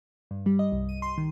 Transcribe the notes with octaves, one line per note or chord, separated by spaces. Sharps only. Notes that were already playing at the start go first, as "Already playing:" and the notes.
G2
G3
D#5
C2
D#7
C6
D#3